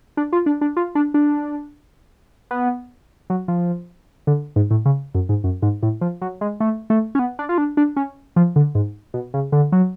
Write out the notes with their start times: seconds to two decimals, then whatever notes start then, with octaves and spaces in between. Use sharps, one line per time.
0.17 D4
0.33 F4
0.46 D4
0.61 D4
0.77 F4
0.95 D4
1.14 D4
2.51 B3
3.30 F#3
3.48 F3
4.27 D3
4.56 G#2
4.71 A2
4.85 C#3
5.15 F#2
5.29 G#2
5.44 F#2
5.62 G#2
5.83 A2
6.01 F3
6.21 F#3
6.41 G#3
6.60 A3
6.90 A3
7.15 C#4
7.19 B3
7.39 D4
7.49 F4
7.58 D4
7.77 D4
7.96 C#4
8.36 F3
8.56 D3
8.75 G#2
9.14 B2
9.34 C#3
9.52 D3
9.72 F#3